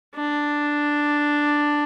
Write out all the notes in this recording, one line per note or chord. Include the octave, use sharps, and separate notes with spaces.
D4